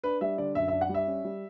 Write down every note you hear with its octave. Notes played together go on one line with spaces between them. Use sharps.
D4 B4
G3 E5
D3 D5
F#2 E5
E5
D4
F#5
G3
E5
C#4
G3